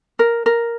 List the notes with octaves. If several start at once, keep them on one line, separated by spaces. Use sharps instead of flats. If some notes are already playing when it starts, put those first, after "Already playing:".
A#4
A#4